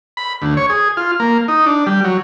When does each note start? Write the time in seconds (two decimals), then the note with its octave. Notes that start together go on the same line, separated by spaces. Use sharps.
0.17 B5
0.42 D2
0.57 C#5
0.70 G#4
0.97 F4
1.20 A#3
1.48 D#4
1.66 D4
1.87 G3
2.04 F#3